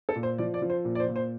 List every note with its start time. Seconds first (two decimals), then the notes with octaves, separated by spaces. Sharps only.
0.09 A4
0.16 A#2
0.23 C5
0.38 F3 D5
0.54 D5
0.62 F3
0.70 C5
0.85 A#2
0.95 D5
1.00 C5
1.08 A#2
1.16 C5